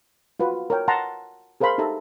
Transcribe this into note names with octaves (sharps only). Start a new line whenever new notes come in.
F4 F#4 B4
A#4 C#5 G5
F#5 A5 A#5 C6
G#4 A#4 C5 F5 B5 C6
D#4 G4 A4 E5 A#5